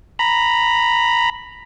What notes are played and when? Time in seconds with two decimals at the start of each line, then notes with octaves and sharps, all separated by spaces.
0.19 A#5 B5